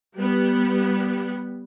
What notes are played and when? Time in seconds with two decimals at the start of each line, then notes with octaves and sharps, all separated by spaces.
0.14 G3 B3